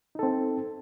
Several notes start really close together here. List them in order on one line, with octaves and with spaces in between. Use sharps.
D#4 A4 C4